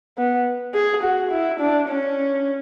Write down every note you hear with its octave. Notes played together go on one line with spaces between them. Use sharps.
B3
G#4
F#4
E4
D4
C#4